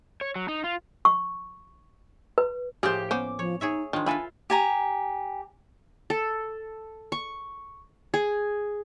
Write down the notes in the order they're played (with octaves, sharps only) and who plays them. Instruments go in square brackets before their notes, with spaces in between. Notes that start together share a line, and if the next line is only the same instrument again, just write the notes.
[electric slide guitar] C#5
F#3
D#4
F4
[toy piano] C#6
B4
[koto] A2 F3 A#3 [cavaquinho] G4 C5 [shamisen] G#4
[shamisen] B3 C#4 C5 [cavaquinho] D6
[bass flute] F3 [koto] C#5
[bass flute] D#4 [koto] G#4 C#5 E5
[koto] D#3 G#3 [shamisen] F3 [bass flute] D4
[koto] E4 A4 B4 [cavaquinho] F4 [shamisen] G#5 B5
[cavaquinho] G4 G#5 A#5
[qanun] A4
C#6
G#4